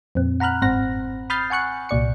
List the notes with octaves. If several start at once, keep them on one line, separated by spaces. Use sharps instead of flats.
F2 A#2 C4
F#5 A#5 B5 F6 F#6
G1 G#2 C4 C5 F#5 A#6
B5 D#6 F6 G6 A6 C7
F#5 G#5 C#6 F#6 C#7
C2 A#2 D5 C#7